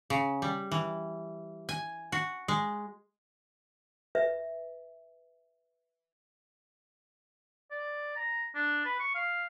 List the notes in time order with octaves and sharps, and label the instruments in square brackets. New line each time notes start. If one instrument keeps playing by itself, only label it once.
[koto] C#3
G3
E3
G#5
F#4
G#3
[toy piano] B4 E5
[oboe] D5
A#5
D4
B4
C#6
F5